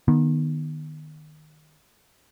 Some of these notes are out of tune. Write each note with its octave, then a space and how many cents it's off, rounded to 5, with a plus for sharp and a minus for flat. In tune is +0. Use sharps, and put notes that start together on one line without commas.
D#3 -20 B3 -25